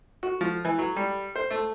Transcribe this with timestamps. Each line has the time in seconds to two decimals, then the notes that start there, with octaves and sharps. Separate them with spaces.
0.23 F#4
0.41 F3
0.65 E3
0.79 F#3
0.97 G3
1.36 C5
1.51 A3